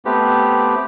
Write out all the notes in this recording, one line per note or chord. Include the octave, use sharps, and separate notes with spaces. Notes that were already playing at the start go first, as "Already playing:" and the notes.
A3 B3 C4 G4